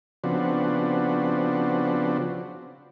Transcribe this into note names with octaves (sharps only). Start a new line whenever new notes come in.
C#3 F3 B3 C4 D4 F#4